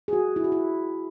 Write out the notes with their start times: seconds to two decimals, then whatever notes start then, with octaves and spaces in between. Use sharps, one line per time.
0.08 G#4
0.13 F#4
0.36 E4
0.44 F#4
0.52 E4